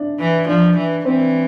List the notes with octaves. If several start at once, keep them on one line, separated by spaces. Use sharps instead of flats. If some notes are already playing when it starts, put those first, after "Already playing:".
Already playing: D4 E4 D5
E3
F3 D4 D5
E3
E3 C4 C5